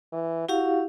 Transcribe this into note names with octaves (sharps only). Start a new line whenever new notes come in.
E3
E4 F#4 G4 F5